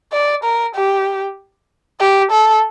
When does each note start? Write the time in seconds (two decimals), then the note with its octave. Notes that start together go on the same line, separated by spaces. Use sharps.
0.13 D5
0.44 A#4
0.76 G4
2.00 G4
2.32 A4